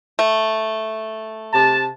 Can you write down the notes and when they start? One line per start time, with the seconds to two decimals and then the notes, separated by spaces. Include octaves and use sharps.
0.19 A3
1.52 C3 A5